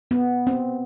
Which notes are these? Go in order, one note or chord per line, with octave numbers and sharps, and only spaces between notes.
B3
C4